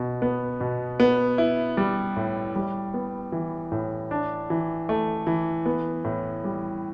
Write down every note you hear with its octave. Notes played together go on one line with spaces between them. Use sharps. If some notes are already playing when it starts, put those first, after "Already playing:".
Already playing: B2
B3
B2
B3
E4
G3
A2
G3
B3
E3
A2
D4
E3
A3
E3
B3
A2
G3